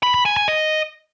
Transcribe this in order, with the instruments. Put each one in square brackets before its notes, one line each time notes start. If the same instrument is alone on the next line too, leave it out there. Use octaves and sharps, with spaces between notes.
[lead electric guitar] B5
B5
G#5
G#5
D#5